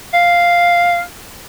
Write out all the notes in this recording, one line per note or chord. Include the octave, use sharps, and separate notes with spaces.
F5